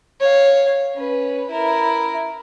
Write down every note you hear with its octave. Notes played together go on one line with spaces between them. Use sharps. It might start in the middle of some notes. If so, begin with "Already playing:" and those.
C#5 F5
C#4 B4
E4 A#4